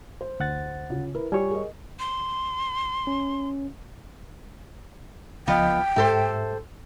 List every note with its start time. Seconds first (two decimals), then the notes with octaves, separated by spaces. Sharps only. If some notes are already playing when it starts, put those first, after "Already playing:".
0.21 C5
0.40 D2 F#5 A6
0.90 C#3 F4
1.15 E4 A#4 B4
1.32 G3 F4 G4 C#5 G#5 C#6
1.51 G#4 A#4 D#5
1.99 C6
3.07 C#4
5.48 C#2 F3 B3 F4 D#5 G5
5.96 G#2 G4 A4 C5 E5